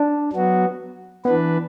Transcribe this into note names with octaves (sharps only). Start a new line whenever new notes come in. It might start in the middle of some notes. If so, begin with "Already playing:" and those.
Already playing: D4
F#3 B3 F#4
E3 B3 D4 B4